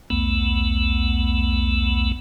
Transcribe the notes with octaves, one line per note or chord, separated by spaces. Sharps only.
B1 E2 A3 B3